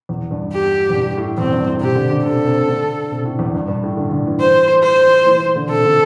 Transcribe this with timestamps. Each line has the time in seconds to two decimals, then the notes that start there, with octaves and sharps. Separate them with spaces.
0.09 E2
0.31 G2
0.53 G4
0.90 E2
0.95 G2
1.17 A2
1.38 E2 C4
1.53 G2
1.67 A2
1.81 C3 G4
1.95 D3
2.10 D3
2.24 C3 A4
2.47 C3
2.68 D3
3.11 C3
3.25 A2
3.39 E2
3.54 G2
3.68 G2
3.83 A2
3.97 D3
4.11 D3
4.26 E3
4.41 C5
4.83 C5
5.26 E3
5.41 E3
5.55 D3
5.69 C3 A4
5.85 D3